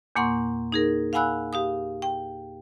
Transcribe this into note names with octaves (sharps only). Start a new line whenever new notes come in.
E2 A#2 A#3 F#5 C6 C#6
D#4 G#4 A#4
F5 F#5 G#5 B5 E6 F#6
G4 F5 D#6
G5